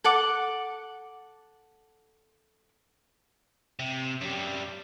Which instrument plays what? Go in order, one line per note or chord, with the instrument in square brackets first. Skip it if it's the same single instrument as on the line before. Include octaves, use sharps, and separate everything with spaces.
[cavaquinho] A4 F#5 D6
[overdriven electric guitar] C3
F#2 G3